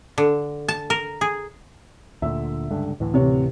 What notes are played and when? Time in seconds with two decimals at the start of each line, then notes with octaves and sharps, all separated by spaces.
0.18 D3
0.68 A5
0.90 A#4
1.21 G#4
2.22 D2 A#2 D3 E5
2.71 C#2 G2 D3
3.00 D2 A2 E3
3.14 C3 C#5